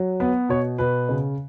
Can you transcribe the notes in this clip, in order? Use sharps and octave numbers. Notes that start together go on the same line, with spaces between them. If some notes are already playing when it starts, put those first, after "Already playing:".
Already playing: F#3
B3 B4
B2 C#5
B2 B4
C#3